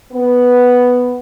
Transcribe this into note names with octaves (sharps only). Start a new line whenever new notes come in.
B3